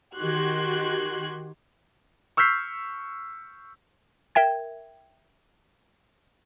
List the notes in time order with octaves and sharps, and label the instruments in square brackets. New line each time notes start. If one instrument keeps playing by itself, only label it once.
[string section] D#3 F#4 G4 C6 F#6 G#6
[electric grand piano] C#6 E6 F6 G6 B6 C7
[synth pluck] A#4 E5 G5 G#6